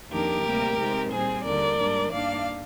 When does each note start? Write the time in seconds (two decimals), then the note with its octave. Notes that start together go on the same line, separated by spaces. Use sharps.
0.11 F2 D#3 A#3 D4 G4 A#4
0.45 D2 C3 G3 A#3
0.78 C3 D#3 G#3 C4
1.11 A#2 G3 C4 G#4 C5
1.44 D#2 D3 G3 A#4 D5
1.77 G#2 G3 A#3 D4
2.11 G2 D#3 A#3 D4 D5 F5